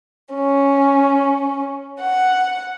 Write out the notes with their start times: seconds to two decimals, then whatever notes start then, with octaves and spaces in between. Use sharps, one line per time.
0.33 C#4
2.00 F#5